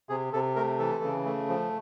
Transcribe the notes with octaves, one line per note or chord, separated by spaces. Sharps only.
C3 G#4
C3 A4
A3 A#4
E3 A4
C#3
A3
F3